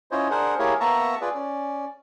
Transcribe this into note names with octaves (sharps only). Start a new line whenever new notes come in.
C#4 E4 F4 C5 C#5 D#5
D4 G#4 A#4 C5 F#5
A#3 E4 G4 G#4 A#4 C#5
A#3 B3 E5 A5 A#5 C#6
F4 G#4 B4 D5
C#4 D5